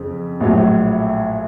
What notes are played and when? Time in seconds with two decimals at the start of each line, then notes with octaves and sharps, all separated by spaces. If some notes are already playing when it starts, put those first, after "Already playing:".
Already playing: F2 C#3 C4
0.40 A#1 A2 F#3